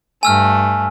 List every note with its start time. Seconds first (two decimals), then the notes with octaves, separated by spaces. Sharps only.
0.23 G2 A3 G#5 E6 F6